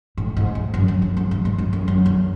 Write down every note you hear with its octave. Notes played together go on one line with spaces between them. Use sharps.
A2
G#2
A2
F#2
F#2
F#2
F#2
G#2
G#2
F#2
F#2
F#2
E2